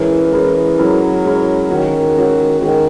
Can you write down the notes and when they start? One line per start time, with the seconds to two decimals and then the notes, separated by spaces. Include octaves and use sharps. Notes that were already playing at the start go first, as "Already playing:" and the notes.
Already playing: E3 G#3 C#4 E4 A#4
0.32 G#3 C#4 E4 A#4
0.78 F#3 G#3 C#4 E4 A#4
1.25 G#3 C#4 E4 A#4
1.69 D#3 G#3 C#4 F#4
2.16 G#3 C#4 F#4
2.61 D#3 G#3 C#4 F#4